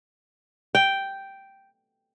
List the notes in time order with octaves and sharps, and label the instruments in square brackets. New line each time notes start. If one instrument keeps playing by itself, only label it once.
[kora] G5